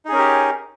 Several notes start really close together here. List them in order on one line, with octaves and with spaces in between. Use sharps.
D#4 G#4 C#4 A#4 G4